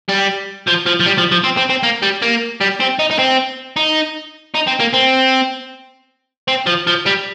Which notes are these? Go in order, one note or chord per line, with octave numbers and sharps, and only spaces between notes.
G3
F3
F3
F3
G3
F3
F3
C4
C4
C4
A#3
G3
A#3
G3
C4
D#4
D#4
C4
D#4
D#4
C4
A#3
C4
C4
F3
F3
G3